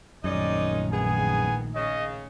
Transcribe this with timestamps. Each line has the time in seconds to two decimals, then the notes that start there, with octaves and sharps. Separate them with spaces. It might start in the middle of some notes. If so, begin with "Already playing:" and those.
0.24 A#1 F#2 A2 D#3 G#3 C#4 D#4 D5
0.92 B3 G#4 G#5
1.75 C#3 D#5